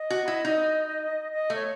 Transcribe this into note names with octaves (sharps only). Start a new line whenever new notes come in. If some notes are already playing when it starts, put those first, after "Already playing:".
Already playing: D#5
F#4
E4
D#4
D#5
A3
C#5